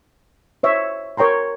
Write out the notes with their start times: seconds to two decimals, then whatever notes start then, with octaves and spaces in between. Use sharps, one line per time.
0.63 C5 C#5 E5
1.17 A#4 C#5 G5 A#5 C6